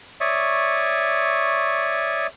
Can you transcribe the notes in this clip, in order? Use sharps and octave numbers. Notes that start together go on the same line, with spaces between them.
C#5 D5 E5 C#6 D#6